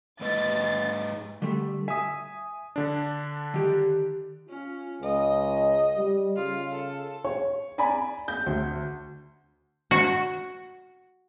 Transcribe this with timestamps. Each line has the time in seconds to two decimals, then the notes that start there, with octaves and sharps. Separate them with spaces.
0.21 G#2 B4 D#5 A6
1.42 D3 G3 A3
1.88 E5 G#5 D#6
2.76 D3 D4
3.54 D#3 G4
4.49 C#4 F4
5.02 C#2 D#5
5.97 G3
6.36 C#3 F4
6.72 A4
7.25 C#5
7.78 D5 G#5 A#5 B5
8.28 G6
8.46 D2
9.91 F#4